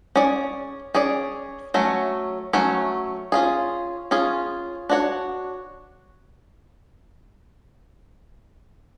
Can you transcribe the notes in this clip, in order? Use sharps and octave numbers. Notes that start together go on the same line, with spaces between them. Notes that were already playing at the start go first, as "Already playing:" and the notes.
C#4 G#4 D5
C#4 G#4 D5
F#3 A3 C#4
F#3 A3 C#4
C#4 F4 G#4
C#4 F4 G#4
D4 F#4 C#5